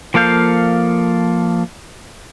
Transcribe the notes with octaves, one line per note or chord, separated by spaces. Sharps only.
F3 A#3 A4 F5 G6